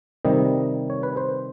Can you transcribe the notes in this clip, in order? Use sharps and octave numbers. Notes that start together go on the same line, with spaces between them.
C3 D#3 G3 D#5
C#5
B4
C5